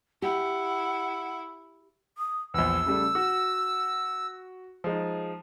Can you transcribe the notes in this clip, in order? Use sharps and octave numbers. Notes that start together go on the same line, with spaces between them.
E4 G4 F#5
D#6
A#1 E2 E6
C#3 G3 A3
F#4
F3 G#3 D#4